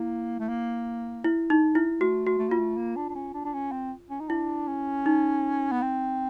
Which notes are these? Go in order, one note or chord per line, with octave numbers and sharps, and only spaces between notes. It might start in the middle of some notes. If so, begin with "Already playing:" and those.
Already playing: A#3 E4
A3
A#3
E4
D#4
E4
A3 F#4
F#4
A3
A#3 F4
A3
A#3
D4
D4
C#4
D4
D4
C#4
C4
C#4
D#4
D4 E4
C#4
D#4
B3
C4